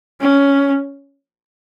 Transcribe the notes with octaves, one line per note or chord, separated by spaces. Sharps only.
C#4